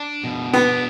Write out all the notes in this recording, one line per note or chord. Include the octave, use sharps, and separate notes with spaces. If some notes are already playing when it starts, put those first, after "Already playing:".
Already playing: D4
B2
B3 D4